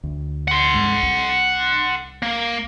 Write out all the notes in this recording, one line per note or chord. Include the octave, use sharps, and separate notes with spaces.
D2
F#5 C6
C2 G2 G#3
C2
A#3